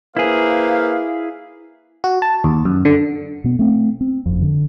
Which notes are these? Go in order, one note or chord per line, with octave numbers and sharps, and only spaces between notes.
A#3 E4 G#4 B4 C5 F5
F#4
A5
D#2
F#2
D3
B2 B3
A3 C4
C4
F#1 F2
D3